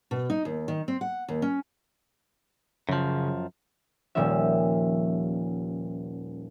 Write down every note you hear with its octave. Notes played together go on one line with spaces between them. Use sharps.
B2
D#4
D#2
D#3
C4
F#5
D#2
C#4
F#2 C#3 F3
D#1 A#2 F3 G3 C#4 E5